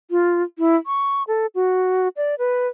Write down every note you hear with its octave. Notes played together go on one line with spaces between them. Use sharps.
F4
E4
C#6
A4
F#4
D5
B4